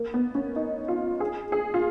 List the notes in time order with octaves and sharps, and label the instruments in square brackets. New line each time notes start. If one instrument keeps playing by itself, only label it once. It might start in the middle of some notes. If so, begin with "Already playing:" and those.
Already playing: [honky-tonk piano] A#3
B3
C#4
D#4
F4
G#4
G#4
F4